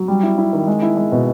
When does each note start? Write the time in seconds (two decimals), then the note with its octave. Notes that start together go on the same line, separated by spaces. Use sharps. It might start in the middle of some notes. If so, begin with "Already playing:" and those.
Already playing: F#3
0.08 G3
0.23 E4
0.38 E4
0.53 D#3
0.67 G#3
0.82 E4
0.97 G#3
1.12 B2